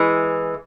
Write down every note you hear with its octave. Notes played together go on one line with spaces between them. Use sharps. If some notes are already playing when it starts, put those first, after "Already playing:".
Already playing: E3 G#3